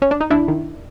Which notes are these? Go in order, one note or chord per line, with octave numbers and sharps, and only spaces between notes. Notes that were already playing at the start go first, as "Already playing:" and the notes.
C#4
D4
D#4
D#2 D4 E4
D#3